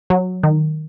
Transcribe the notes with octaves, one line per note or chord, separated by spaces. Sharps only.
F#3
D#3